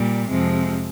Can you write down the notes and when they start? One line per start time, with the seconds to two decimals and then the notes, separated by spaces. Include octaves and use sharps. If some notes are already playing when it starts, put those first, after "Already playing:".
Already playing: A#2 G3
0.29 F2 C3 F3 G#3